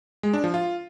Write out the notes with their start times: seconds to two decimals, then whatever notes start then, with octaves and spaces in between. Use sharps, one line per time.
0.23 G#3
0.34 D4
0.44 F3
0.54 F4